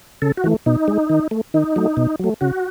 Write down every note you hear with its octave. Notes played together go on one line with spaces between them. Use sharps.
C#3 A4
F#4
E3 A3
B2 D#4
G#3
D#3
A3
D#3 D#4
F#3 A3
B2
F#3 A3
C#3 F#4